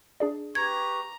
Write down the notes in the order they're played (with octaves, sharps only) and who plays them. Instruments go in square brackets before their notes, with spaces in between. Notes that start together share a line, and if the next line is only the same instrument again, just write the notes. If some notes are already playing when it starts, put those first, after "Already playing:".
[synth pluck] D4 G#4 D5
[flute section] G4 B4 C#6 [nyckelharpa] A#5 [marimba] G#6